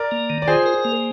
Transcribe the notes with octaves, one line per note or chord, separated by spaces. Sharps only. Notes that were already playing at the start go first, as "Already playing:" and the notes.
Already playing: A#4 D5
A#3
D#3
D5
F4 G#4 C5
A#4
A#3